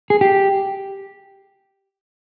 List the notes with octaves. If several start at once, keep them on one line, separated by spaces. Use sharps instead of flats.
G#4
G4